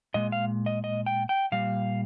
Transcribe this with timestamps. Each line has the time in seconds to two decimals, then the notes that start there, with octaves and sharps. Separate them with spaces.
0.14 A#2 G#3 D#5
0.32 F5
0.66 D#5
0.84 D#5
1.06 G5
1.29 G5
1.52 A#2 G3 F5